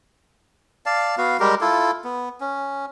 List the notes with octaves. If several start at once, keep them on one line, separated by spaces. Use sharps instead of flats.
D5 F5 A5
B3 F#4 F5
G3 G#3 G4 A#4
E4 F4 A4
B3
C#4